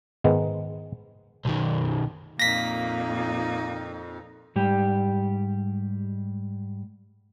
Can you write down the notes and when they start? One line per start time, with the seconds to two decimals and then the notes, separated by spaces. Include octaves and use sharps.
0.24 G#2 D#3 G#3 B3
1.45 B1 D#3
2.39 F2 A#2 A#3 D#4 A#6 B6
4.56 G#2 G3 G4